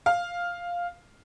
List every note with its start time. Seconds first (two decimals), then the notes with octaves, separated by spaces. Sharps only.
0.06 F5